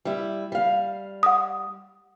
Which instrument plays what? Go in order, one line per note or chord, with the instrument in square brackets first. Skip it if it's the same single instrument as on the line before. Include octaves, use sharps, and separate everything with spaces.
[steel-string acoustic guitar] G3 E4
G3 F5
[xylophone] F#5 D#6